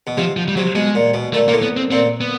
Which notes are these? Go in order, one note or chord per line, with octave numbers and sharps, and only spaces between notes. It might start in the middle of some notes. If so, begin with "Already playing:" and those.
B2
C3 F3
F3
G3
C3 F#3
B2 G#3
A#2
B2
A#2 A3
A#2 A#3
A2
B3
C4
A#2 C4
B3